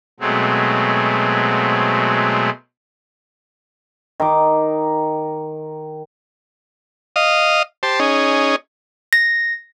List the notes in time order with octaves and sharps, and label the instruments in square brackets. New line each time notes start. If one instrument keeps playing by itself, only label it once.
[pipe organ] B2 F#3 G#3 A3 C4
[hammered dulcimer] D#3 D6
[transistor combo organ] D#5 F5
G4 C5 A5
C#4 D#4 G#4
[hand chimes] A#6